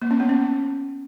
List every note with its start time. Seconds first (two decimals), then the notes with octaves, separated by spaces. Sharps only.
0.02 A#3
0.11 C#4
0.20 B3
0.29 C#4